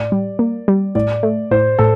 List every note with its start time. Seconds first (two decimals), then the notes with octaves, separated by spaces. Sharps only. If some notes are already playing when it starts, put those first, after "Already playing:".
Already playing: A2 D5
0.12 G3
0.39 A#3
0.68 G3
0.95 A2 D5
1.23 A3
1.51 A2 C5
1.79 A2 A4